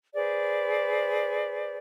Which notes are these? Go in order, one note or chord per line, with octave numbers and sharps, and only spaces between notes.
G#4 B4 C5 D5